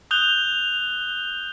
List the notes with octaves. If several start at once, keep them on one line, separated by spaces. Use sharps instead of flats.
D#6 F#6 G6 F7 G7